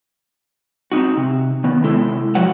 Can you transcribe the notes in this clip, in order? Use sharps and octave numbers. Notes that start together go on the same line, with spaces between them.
C4 C#4 D#4 F#4
C3
D#3 B3
C3 G#3 E4 A4
B2 F3 F#3 B4 F#5